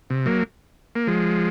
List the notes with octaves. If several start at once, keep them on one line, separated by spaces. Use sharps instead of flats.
C3
F#3 A#3
A#3
F3 G#3